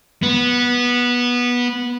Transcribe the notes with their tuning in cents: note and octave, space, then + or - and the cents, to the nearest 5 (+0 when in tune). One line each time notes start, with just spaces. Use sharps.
B3 -15